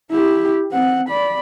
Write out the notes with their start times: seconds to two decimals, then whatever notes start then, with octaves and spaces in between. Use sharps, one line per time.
0.11 E4 G4
0.72 C4 F#5
1.09 D5 B5